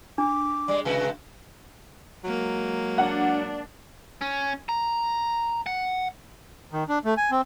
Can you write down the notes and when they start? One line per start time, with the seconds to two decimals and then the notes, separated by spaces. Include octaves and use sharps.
0.18 D4 D6
0.68 G3 G#3 D5
0.85 C3 G#3 F#4 B4
2.24 F#3 G#3 A#3
2.98 D4 F#5
4.21 C#4
4.69 A#5
5.66 F#5
6.73 D#3
6.89 D4
7.05 A3
7.17 G#5
7.31 C4